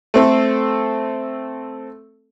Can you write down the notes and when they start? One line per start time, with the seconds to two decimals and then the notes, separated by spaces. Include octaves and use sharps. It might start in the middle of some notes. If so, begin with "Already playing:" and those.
0.14 A3 C4 A4